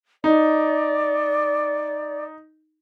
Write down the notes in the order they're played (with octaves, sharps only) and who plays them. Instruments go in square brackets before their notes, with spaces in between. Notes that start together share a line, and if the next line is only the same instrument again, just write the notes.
[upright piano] D#4 [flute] D5